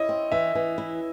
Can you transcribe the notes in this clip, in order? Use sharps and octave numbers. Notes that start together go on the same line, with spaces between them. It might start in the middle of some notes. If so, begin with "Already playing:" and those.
Already playing: E4 C#5 D#5
C4
E3 E5
E3
E4